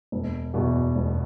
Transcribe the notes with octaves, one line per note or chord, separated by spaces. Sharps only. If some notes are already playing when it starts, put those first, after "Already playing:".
E1
E2 B2
E1